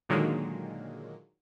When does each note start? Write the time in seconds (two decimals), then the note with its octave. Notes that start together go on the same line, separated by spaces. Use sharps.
0.09 A#2 D3 D#3 F#3 G#3 A#3